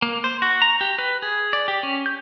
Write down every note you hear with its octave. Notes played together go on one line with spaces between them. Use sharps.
A#3
C5
F#4
A#5
G4
B4
G#4
D5
G4
C#4
G6